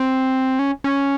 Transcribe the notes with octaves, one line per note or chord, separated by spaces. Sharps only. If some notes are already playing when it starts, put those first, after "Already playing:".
Already playing: C4
C#4
C#4